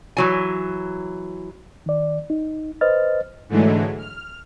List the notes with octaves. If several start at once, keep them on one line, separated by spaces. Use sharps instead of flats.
E3 F#3 G#5
D#3 D5
D#4
B4 C5 D#5 F6 A6
G#2 D3 E3 F#3 G#3 A3
F6